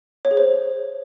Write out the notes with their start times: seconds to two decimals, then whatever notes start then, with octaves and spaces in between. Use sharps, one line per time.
0.25 C#5
0.31 G#4
0.37 C5